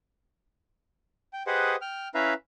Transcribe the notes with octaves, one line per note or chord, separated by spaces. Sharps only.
G5
G4 G#4 B4 C5 D#5 F#5
G5 F6
C#4 E4 B4 E5 F5 A#5